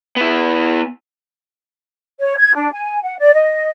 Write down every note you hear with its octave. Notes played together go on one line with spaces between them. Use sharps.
B3 E4
C#5
G#6
D4
G#5
F#5
D5
D#5